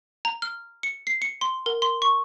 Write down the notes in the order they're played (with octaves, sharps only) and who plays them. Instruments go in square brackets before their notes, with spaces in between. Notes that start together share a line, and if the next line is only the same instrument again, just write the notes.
[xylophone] A#5
F6
C#7
C7
C#7
C6
A#4
C6
C#6